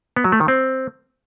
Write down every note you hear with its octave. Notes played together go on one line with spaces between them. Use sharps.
B3
F#3
A3
D#3
C4